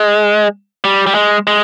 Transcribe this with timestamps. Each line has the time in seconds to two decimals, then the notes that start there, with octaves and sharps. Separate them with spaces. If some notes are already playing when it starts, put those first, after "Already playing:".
Already playing: G#3
0.84 G3
1.07 G3
1.15 G#3
1.47 G#3